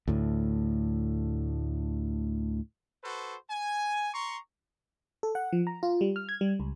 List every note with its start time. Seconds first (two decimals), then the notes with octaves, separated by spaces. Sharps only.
0.08 D2 A2
3.03 F#4 A4 B4 C5
3.49 G#5
4.13 A#5 C6 C#6
5.23 A4
5.35 F#5
5.53 F3
5.67 A#5
5.83 F4
6.01 G3
6.16 F6
6.29 G#6
6.41 G3
6.60 C#2